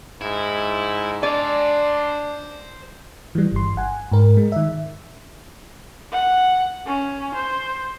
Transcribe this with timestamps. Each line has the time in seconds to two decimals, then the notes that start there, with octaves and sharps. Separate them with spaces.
0.21 G#2 E4
1.23 D4 C5 D5 G#5
3.35 E3 G3
3.52 G1 C6
3.77 F#5 G#5
4.12 G#2 A#4
4.37 G#3
4.52 D#3 E5
6.12 F#5
6.87 C#4
7.35 C5